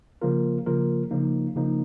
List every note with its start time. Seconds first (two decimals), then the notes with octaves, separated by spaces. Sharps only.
0.22 C#3 F3 A#3 F4 A#4
0.66 C#3 F3 A#3 F4 A#4
1.11 C#3 F3 A#3 D#4
1.56 C#3 F3 A#3 D#4